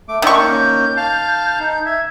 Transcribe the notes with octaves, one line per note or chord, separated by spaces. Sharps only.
A3 D6
D#3 C#4 D4 E5 C#6
A#3 C#4 G6
F5 A5
D#4
E5 G#6